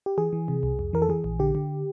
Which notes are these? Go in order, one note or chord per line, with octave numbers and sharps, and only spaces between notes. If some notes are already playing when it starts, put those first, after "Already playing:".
G4
E3 G#4
E3
C3
C2
F2
E3 A#4
A4
E3 G#4
A#1
D3 G4
D3